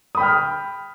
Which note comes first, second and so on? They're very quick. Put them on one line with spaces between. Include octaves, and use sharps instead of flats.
D#6 B5 G5 F6